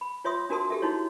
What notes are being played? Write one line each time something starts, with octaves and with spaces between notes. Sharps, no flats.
B5
F4 C#5 E5 C6 D#6
D4 F#4 A#4 A5 C6 D#6
G4 A4 E5
D#4 E4 F#4 C#5